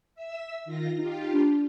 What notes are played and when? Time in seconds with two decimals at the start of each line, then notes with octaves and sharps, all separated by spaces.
0.15 E5 E6
0.65 D#3 F4 A#6
0.98 D#4 F4 G4
1.33 D4